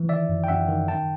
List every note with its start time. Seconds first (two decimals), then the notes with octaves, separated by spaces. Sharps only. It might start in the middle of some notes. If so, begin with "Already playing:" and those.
Already playing: E3
0.09 D#3 D5 E5
0.29 F#2
0.44 G5
0.48 F#2 E5 F#5
0.68 D#3
0.88 D#3 G5 A5